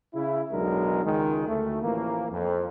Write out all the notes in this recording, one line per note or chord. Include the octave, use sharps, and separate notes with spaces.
C#3 E4
B1 E2 F#3 G#3 D4 A#4
C#2 D#3 G#3
D2 A3
A1 E3 F3 A#3
F2